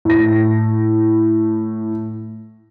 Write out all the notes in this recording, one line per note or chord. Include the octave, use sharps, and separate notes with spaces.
A2 A#6